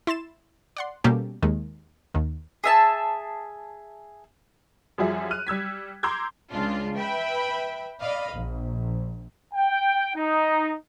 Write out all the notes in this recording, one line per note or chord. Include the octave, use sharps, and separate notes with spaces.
E4 C6 A6 E7
D5 F#5 C6
B2 G3 A#3 C#4 G4 A4
D#2 D#3 G#3
D#2 D#3
G#4 E5 A5
F#2 F3 G3 F#4 G#4 E5
F6 F#6 D#7
G3 E6 G#6 B6
A#5 C6 D6 E6 G6 G#6
C#2 C#3 D4 F4
B4 E5 G5 B5
D5 D#5 F5 B5
A#1
G5
D#4